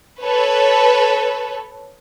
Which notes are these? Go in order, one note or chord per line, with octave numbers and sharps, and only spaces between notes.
A4 B4 C#5